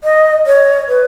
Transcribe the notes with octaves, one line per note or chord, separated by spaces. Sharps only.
D#5
C#5
B4